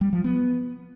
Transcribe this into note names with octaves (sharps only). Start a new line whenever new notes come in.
G3
F3
B3